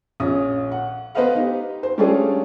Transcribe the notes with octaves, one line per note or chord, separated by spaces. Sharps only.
A#1 C#4 D#6
F#5
B3 B4 C5 D#5 F5 F#5
D#4 G4
C5
G3 A3 C#4 D4 F4 G#4